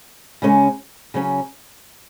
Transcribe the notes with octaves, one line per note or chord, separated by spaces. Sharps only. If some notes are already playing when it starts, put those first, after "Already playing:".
C#3 G#3 C#4
C#3 F#3 C#4